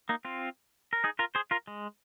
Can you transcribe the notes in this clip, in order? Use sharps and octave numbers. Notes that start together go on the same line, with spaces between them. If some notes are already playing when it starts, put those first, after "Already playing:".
A#3 D#4
C4 F4
A#4
D#4 G#4
F4 A#4
G#4 C5
F4 A#4
G#3